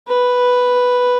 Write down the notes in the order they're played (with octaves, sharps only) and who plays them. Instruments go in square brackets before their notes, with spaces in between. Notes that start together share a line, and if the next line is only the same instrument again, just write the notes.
[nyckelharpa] B4